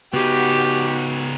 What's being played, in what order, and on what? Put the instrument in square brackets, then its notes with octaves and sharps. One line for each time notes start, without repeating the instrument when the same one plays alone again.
[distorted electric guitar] C#3 D#4 [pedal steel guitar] B3 [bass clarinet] F#4 [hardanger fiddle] G4